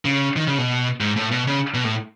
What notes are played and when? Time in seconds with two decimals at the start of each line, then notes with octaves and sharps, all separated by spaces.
0.05 C#3
0.36 D#3
0.47 C#3
0.58 B2
1.00 G#2
1.16 A2
1.31 B2
1.47 C#3
1.74 B2
1.84 A2